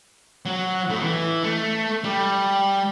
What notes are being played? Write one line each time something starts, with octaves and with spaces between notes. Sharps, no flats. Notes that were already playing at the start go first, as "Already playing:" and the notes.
F#3
A2
E3
A3
G3